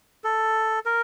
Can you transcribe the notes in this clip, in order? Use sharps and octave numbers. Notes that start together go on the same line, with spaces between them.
A4
A#4